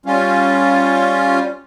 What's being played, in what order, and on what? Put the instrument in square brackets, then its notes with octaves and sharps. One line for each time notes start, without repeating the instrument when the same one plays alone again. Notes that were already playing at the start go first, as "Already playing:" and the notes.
[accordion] G3 C#4 F4